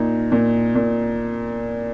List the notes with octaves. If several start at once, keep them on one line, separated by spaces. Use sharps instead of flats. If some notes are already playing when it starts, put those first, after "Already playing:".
Already playing: A#2 D#4
A#2
A#2